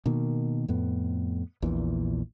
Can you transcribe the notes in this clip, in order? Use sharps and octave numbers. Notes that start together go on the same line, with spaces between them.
B2 D#3 A#3
F2 A2 B3
A#1 E2 A#2 E3